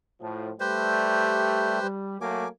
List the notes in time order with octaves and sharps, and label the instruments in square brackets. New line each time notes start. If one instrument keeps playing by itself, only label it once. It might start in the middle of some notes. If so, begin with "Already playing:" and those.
[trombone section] A2 F3
[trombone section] G3 A3 [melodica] G4 B4 C5
[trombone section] G3
[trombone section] F#3 A3 A#3 [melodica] G#5 D6